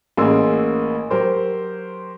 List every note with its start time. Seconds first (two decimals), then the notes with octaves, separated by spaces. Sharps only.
0.17 A1 A#3 C#4 G#4 C6 E6
1.10 F#3 G4 A#4 C5